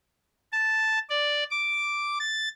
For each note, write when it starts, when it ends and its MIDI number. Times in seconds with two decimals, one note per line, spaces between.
0.52 0.99 81
1.09 1.43 74
1.51 2.18 86
2.19 2.49 93